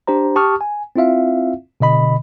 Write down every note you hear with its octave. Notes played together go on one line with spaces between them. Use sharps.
D4 G4 C5 A#5
G4 A5 C#6 D#6 F6
G#5
C4 E4 F4 E5 F5
B2 D3 D#5 B5